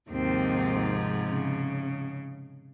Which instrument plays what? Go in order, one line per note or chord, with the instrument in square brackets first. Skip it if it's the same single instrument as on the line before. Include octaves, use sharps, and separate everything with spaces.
[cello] D#2 C4 [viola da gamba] G#2 C3 F3
[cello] C#3